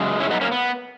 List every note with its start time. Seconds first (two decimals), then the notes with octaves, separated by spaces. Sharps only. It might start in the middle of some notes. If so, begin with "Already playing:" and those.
Already playing: F#2 C#3 G#3
0.20 C#4 E4
0.31 B3 D#4
0.41 A#3 C#4
0.52 B3